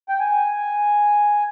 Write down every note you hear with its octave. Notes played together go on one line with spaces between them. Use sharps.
G5
G#5